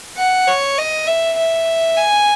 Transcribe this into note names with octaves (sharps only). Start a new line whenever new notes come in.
F#5
C#5
D#5
E5
E5
G#5